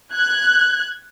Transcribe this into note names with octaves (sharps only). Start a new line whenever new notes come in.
F#6 G#6